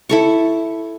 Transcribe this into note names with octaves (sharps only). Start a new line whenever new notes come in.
E4 A4 C#6